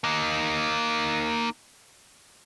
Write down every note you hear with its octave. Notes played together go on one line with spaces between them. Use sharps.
A#3 D#4